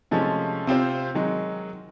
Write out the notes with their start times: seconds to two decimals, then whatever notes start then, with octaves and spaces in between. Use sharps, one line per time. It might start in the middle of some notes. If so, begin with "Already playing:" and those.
0.11 C3 F3 G#3 A3 C#4
0.67 C3 C4 F4 C5
1.15 D#3 F#3 G#3